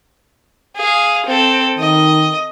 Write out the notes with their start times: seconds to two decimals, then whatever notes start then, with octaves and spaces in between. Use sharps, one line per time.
0.76 G#4 F5
1.26 C4 A4
1.79 D#3 D#5